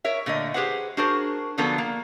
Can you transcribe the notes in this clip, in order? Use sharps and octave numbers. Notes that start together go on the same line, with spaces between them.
A#4 C#5 E5
A#2 D3 A3 D#5
G4 G#4 B4 C5 F#5
D4 F#4 G#4 A#4 C5
D3 F3 F#3 B3 D4 A4
A#3